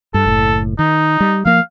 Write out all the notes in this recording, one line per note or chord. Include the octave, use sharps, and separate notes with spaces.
G2 A4
F#1 A2
D#3 D#4
G3
F3 A#3 F5